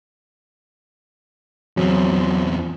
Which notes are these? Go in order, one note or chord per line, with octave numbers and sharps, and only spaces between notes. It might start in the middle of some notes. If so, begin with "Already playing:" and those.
E2 F#3 C4